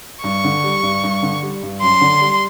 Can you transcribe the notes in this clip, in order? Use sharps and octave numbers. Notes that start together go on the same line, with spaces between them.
G2 C#6
D3
G3
G2
G2
D3
G3
G2
F#2 C6
D3
G3